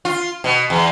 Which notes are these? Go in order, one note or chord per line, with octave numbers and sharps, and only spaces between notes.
F4
B2
E2